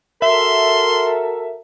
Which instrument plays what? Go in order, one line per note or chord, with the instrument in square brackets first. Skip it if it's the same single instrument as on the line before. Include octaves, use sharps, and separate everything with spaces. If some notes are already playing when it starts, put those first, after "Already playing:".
[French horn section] F#4 A4 A#4 [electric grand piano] E5 [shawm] C6